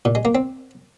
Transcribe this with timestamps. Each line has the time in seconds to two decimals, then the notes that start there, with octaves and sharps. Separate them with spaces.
0.05 A#2
0.15 G#3
0.25 A#3
0.35 C4